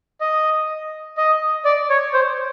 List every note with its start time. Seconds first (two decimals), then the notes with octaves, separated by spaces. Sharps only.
0.21 D#5
1.17 D#5
1.65 D5
1.90 C#5
2.14 C5